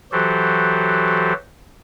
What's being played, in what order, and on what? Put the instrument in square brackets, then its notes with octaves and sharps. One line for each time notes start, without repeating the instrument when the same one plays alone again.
[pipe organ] E3 F#3 F#4 G4 A4 C5